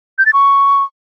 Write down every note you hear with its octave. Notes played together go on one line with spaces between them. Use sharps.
G6
A6
C#6